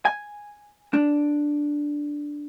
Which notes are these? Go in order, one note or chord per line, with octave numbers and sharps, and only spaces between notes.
G#5
D4